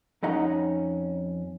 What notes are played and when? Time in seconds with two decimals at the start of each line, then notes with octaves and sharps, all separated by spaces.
0.23 F2 C#4 D#4 D#5 F#5 A#5